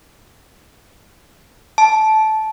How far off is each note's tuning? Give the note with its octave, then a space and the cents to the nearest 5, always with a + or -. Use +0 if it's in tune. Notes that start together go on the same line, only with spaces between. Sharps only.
A5 -15